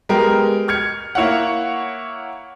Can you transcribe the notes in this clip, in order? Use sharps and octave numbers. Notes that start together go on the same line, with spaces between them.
G#3 B3 G4 A#4
F6 G#6 C#7
A#3 E4 C#5 F5 F#5